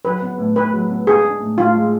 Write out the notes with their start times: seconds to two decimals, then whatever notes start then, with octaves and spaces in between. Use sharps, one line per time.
0.05 F#3 B4
0.22 B3
0.38 A2
0.55 A2 B4
0.73 F#3
0.90 B3
1.07 G#3 G#4
1.24 D4
1.40 A2
1.58 A2 F4
1.75 G#3